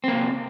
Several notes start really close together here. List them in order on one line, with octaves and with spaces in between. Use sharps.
C4 A#3 C3